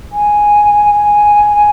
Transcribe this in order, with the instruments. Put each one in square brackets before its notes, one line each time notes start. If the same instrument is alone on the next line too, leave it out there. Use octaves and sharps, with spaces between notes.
[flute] G#5